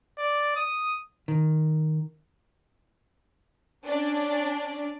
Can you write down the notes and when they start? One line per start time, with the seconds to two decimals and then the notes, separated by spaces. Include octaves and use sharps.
0.18 D5
0.56 D#6
1.28 D#3
3.86 C#4 D4 D5